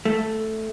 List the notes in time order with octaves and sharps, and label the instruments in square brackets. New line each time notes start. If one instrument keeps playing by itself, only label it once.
[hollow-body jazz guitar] A3